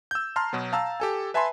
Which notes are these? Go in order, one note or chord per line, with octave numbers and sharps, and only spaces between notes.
E6 G6
A5 A#5 C6 F6
B2 F#3 B3
F5 A5 A#5 E6
G4 A4 G#5
B4 E5 G#5 A5 B5 C6